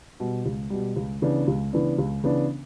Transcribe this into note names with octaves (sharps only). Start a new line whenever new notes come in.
B2 G3
C#2
B2 G3
C#2
C#3 E3 B3 D4
C#2
C#3 E3 B3 D4
C#2
C#3 E3 B3 D4